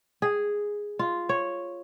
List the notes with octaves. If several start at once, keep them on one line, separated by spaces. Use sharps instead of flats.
G#4
F4
C#5